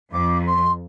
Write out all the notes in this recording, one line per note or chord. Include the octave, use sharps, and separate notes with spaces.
F2 D6
C6